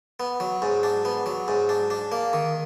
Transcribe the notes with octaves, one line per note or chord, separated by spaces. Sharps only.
B3
F#3
G#2
D4
B3
F#3
G#2
D4
D4
A#3
D#3